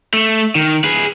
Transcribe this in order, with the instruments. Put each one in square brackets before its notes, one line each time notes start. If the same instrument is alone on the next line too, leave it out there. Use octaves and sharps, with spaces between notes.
[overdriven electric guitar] A3
D#3
G#4 B4